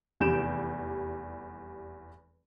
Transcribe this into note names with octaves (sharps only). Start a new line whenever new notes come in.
F1 E2 G3 G6 D7 E7